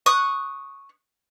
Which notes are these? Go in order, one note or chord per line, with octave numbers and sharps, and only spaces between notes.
C#6 D#6 F#6